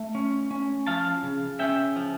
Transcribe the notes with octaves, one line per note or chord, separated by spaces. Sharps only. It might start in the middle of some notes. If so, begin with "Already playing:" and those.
Already playing: A3
C#4
C#4
F3 F5 A5
C#3
C#4 E5 G5
F3